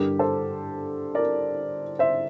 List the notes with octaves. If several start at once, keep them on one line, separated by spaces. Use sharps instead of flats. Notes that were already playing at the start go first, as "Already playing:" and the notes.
Already playing: G2 D3 G3 G4 A#4
A4 C5
A#4 D5
C5 E5